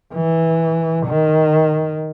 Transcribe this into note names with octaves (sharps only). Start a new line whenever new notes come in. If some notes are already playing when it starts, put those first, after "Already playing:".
E3
D#3